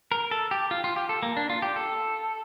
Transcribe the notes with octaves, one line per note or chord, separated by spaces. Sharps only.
A#4
A4
G4
F4
F4
G4
A4
A#3
D4
F4
G4
A4